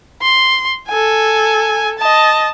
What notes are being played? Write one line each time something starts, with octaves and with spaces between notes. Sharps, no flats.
C6
A4 G#5
D#5 A5